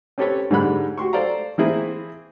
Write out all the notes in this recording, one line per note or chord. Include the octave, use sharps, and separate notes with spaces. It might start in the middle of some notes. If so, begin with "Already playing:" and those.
C4 C#4 G4 A4 B4 C#5
G#2 D3 G3 G#3 B5 F#6
F#4 G4 C6 C#6
A4 C5 D5 F5 A#5
E3 A#3 C4 E4 G#4